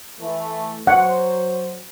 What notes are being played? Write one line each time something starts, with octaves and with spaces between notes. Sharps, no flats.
E3 A3
F#3 C5 F#5